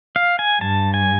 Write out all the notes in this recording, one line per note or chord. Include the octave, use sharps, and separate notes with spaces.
F5
G#5
G2 A5
G#5